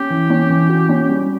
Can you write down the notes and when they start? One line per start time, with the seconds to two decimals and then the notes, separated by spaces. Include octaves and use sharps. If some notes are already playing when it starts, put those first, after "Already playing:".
Already playing: C#4 G4
0.10 E3
0.30 C#4
0.50 E3
0.69 F#4
0.89 C#4
1.09 G3